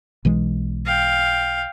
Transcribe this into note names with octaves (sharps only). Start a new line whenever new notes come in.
B1 E3 G#3
F5 G5